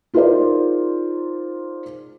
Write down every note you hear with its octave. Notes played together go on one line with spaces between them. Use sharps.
D#4 F4 G#4 A#4 C5 D5